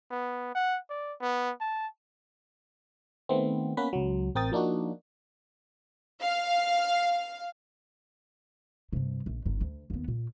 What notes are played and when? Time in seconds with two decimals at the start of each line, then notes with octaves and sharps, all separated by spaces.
0.11 B3
0.55 F#5
0.89 D5
1.21 B3
1.61 A5
3.29 D#3 A3 B3 C4
3.77 A#3 B3 C#4 B4 B6
3.93 C#2 F#3
4.35 A1 C4 A#4 G5 D#6 A6
4.52 F3 A#3 D4 D#4 F#4
6.21 F5
8.93 G2 C3
9.26 A#1
9.46 G1 D#4
9.61 D2
9.90 D#2 B3
10.08 A#2